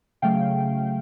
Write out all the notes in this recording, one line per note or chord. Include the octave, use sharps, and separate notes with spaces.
C#3 F#3 A3 F5 G5